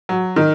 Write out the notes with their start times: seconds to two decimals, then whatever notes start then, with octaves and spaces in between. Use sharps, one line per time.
0.09 F#3
0.36 D#3